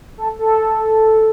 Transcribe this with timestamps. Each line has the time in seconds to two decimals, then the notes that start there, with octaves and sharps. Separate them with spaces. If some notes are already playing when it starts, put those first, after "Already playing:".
0.18 A4
0.39 A4